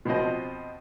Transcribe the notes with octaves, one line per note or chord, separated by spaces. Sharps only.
B2 F3 C4 D#5